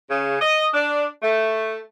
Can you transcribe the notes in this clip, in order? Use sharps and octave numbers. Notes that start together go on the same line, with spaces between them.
C#3
D#5
D4
A3